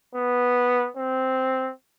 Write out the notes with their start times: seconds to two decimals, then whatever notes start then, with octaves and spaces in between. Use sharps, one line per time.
0.15 B3
0.97 C4